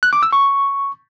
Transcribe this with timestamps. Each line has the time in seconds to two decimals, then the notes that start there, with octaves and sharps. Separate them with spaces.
0.03 F#6
0.13 D6
0.23 E6
0.33 C#6